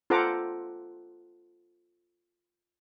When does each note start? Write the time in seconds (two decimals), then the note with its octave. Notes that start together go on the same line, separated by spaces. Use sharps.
0.10 F4 A4 C5 F#5 A#5 D6